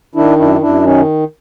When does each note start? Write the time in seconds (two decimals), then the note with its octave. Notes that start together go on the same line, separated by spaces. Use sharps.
0.15 D#3 D4 E4
0.38 F#2 D4 E4
0.61 F#2 D4 E4
0.83 D#3 C#4 D#4